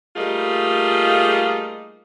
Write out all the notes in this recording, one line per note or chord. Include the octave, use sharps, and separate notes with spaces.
G3 A3 A#3 D#4 F4 G#4